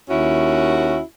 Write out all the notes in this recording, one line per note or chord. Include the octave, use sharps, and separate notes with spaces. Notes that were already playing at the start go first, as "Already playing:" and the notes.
D#2 C#4 E4 F#4